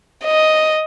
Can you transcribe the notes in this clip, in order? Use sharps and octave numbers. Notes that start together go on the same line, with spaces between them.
D#5